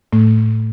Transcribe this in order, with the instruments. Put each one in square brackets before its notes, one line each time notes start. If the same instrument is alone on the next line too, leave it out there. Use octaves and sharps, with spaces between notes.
[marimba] A2 A3